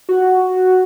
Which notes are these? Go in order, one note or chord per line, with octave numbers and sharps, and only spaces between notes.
F#4